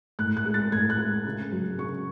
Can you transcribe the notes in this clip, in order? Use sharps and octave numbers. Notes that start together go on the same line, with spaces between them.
A2 F#6
F#6
G#3
A6
A2 G#6
F#6
G#3
C#3
F#3
C#3 C#6